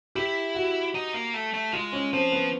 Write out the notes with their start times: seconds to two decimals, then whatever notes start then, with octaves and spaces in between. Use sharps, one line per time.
0.15 E4 G4
0.55 F#4
0.95 D#4
1.14 A#3
1.34 A3
1.54 A3
1.73 G#3 F4
1.93 C#4
2.13 F3 C4
2.32 B3